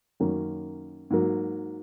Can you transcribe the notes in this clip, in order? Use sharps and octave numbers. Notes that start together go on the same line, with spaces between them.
F#2 D#3 A#3 C#4
G#2 F#3 A#3